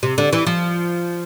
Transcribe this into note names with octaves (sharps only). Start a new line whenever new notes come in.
C3
D3
E3
F3